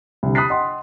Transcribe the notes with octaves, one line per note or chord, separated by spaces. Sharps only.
C2 D3
B5 D#6 F#6 A6 B6 C7
D#5 F#5 G5 C6 D#6